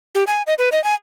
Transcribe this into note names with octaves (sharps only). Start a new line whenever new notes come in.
G4
G#5
D#5
B4
D#5
G#5